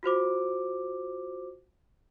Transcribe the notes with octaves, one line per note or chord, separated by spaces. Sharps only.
F4 F#4 C5 D6